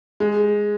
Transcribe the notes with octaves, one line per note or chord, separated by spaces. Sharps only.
G#3